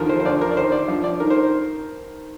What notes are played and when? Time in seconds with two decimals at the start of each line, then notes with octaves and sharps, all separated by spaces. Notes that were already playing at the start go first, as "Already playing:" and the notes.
Already playing: D#2 D3 F3 A#4
0.09 C5
0.20 C5
0.25 D2 D3 F3 D5
0.41 A#4
0.51 D5
0.57 D#2 D#3 C5
0.72 D5
0.88 G2 F3
1.04 D5
1.20 D#3 A#4
1.30 C5